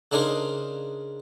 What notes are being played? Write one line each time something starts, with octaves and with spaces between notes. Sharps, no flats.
C#3 D4 D#4 G#4 A#4 C5